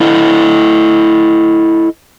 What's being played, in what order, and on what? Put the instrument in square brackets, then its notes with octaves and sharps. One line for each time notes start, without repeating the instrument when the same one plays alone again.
[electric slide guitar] E4 A4 D#5